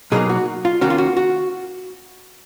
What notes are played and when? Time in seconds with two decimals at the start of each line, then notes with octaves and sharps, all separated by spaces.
0.12 B2 F#3 A#3 D#4 G#4
0.29 F#4
0.65 F4
0.81 D#3 A#3 C#4 F#4
0.90 F4
0.98 F#4
1.17 F#4